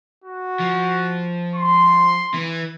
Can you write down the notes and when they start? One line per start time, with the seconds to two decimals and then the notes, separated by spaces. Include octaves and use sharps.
0.24 F#4
0.59 F3
1.56 C6
2.34 E3